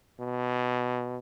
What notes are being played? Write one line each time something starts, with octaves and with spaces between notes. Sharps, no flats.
B2